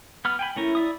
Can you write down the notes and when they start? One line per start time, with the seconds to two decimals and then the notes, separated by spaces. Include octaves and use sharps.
0.25 B3 B5 F6
0.39 G5 G#5 B5
0.56 A3 C#4 E4 A#4
0.75 D5 E5 D#6